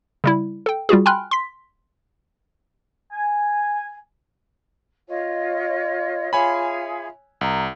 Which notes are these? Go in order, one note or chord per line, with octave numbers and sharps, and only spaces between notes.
C#3 G3 E4
A4 G5
G3 F4 F#4 G#4
G5 G#5 B5 C6 F6 F#6
C6 B6
G#5
F4 C#5 D#5
F4 G#4 C#5 E5 G#5 B5
C2 A#5